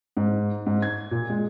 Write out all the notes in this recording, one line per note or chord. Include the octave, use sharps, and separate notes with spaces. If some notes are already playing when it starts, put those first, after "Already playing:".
G#2
G#2
G#6
A#2
G#3